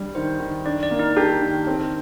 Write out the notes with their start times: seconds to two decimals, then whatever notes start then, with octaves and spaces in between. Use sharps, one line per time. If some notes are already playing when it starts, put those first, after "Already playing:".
Already playing: G3 D4
0.15 D#3 C5
0.40 D#3
0.66 D4 D5
0.83 D5
0.91 A#3
0.99 D#4
1.17 D4 G4
1.42 D#3
1.67 C4